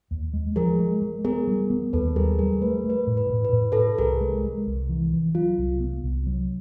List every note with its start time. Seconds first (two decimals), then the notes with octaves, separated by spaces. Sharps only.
0.11 D#2
0.33 G#3
0.56 F3 G#4 A#4
0.79 G#3
1.02 G#3
1.25 B3 G#4 A#4
1.47 G3
1.70 B3
1.93 D#2 A4 B4
2.16 G3 G#4 A#4
2.39 G3 G#4 A#4
2.61 A3 B4
2.84 A3
2.90 B4
3.07 A2
3.17 B4
3.30 A2
3.45 B4
3.53 A2
3.72 A4 B4
3.75 A2
3.98 C2 G#4 A#4
4.21 G#3
4.44 G#3
4.66 C2
4.89 E3
5.13 E3
5.35 F#3 F4
5.58 C2
5.80 B3
6.04 C2
6.27 F#3